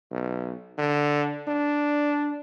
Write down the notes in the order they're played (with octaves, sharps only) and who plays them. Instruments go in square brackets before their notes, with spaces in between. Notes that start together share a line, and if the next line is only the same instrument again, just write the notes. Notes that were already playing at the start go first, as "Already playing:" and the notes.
[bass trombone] B1
D3
D4